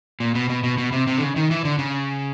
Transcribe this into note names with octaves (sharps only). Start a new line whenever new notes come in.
A#2
B2
B2
B2
B2
C3
C3
D3
C#3
D#3
E3
D3
C#3